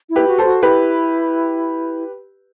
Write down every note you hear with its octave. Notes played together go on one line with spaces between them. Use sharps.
E4
G4 B4
F#4
A4 C5
F#4
E4 G4 B4